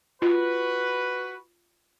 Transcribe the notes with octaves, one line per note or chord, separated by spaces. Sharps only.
F4 F#4 B4